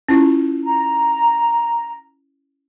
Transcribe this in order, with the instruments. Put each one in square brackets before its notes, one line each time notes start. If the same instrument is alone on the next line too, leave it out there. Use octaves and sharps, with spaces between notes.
[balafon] C#4 E4 F4
[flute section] A#5